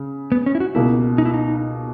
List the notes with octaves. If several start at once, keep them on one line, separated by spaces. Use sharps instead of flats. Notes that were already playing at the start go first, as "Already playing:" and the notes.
Already playing: C#3
B3
C#4
E4
F#4
C#2 B2 A#3 E4
D#4
E4
D#4